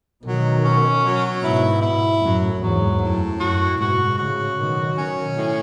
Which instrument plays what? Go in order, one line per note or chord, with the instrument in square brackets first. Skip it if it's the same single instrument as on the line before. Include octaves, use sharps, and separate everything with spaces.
[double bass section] B2 D#3 [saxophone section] F#3
[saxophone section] C#4
F#3
[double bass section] G#2 B2 [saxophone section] E4
[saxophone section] E4
[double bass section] F#2 A2 [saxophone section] F#3
[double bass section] E2 G#2 [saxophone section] F#3
[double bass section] F#2 [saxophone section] A2
[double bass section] F#2 [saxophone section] F#4
[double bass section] G#2 B2 [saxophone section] F#4
[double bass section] A2 C#3 [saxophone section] F#4
[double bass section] B2 D#3 [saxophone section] F#3
[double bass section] B2 D#3 [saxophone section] C#4
[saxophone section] A2